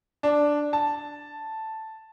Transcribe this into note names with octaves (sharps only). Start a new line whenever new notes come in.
D4
A5